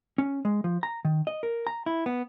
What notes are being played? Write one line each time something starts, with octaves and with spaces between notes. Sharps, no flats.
C#4
G#3
F3
A#5
D#3
D#5
A#4
A#5
E4
B3